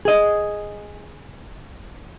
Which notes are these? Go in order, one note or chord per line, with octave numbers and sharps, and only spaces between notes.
G#4 D#5